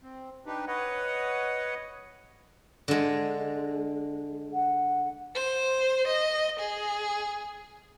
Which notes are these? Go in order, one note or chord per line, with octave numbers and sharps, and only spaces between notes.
C4
D4 D#4 G4 B4
B4 C#5 D#5 F#5
D3 G#3
F#5
C5
D#5
G#4